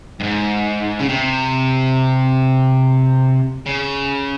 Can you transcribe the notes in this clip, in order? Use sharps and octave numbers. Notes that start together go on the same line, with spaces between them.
G2
G#2
C#3
C3
C#3